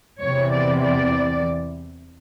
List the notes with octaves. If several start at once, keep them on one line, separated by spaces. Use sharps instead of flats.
E2 C3 E3 C#5
D5
D5